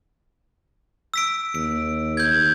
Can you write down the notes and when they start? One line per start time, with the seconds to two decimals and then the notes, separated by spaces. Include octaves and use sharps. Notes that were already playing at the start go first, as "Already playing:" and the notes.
1.14 E6 B6 D7
1.55 D#2 D7
2.17 G6 G#6